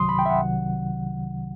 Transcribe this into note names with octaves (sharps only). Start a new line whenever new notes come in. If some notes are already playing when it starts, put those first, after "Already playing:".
Already playing: C2 C3 D#3 F#3 C6 D#6
B5
G5
E5
F#5
C2 C3 D#3 F#3